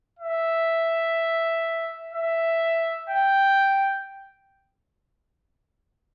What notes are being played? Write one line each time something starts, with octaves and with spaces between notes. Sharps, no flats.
E5
E5
G5